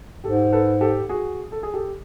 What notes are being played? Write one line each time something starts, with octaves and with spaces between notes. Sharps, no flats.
G#2 G4 A4
A4 B4
G4 A4
F#4 G#4
A4
G#4
G4 A4